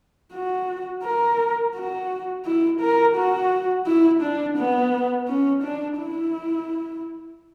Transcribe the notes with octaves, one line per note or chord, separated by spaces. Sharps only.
F#4
A#4
F#4
E4
A#4
F#4
E4
D4
B3
C#4
D4
E4